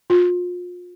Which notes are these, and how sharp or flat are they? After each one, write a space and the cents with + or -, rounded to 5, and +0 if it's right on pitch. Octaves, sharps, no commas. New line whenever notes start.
F4 +35